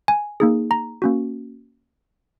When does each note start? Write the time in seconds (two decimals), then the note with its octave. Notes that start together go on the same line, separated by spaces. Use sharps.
0.08 G#5
0.40 A#3 D#4 G#4
0.71 A#5
1.02 A#3 C#4 F#4